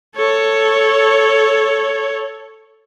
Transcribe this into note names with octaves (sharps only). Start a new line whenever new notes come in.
A4 C#5